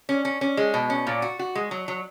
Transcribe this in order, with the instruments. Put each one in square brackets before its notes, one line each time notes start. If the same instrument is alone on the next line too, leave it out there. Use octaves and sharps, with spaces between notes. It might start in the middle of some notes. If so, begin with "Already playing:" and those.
[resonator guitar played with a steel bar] C#4
C#4
C#4
G#3
B2
C#4
A#2
F#4
F#4
G#3
F#3
F#3